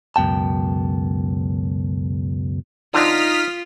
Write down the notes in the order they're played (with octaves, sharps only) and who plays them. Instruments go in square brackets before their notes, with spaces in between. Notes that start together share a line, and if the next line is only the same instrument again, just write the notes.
[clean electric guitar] C#2 F#2 B2 G5 A5
[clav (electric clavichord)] D3 C4 D4 [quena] D#4 [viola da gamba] F4 [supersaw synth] D#6 F6 B6